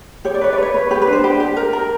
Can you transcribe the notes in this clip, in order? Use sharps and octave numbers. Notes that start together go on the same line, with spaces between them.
G4 C#5
D5
B4 C#5
D5
B4 C#5
B4
G4 B4
B4
D4
C5
G4
G4
A#4
A#4